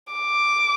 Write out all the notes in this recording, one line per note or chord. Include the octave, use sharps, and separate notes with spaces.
D6